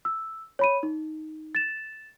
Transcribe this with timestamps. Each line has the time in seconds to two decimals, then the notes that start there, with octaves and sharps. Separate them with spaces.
0.05 E6
0.59 C#5 B5 D#7
0.83 D#4
1.55 A6 E7